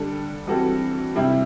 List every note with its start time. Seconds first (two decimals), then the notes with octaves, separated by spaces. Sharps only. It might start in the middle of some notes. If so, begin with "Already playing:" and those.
Already playing: D3 G3 D4 A4
0.47 E3 G3 C4 F#4 A4
1.16 C3 G3 C4 E4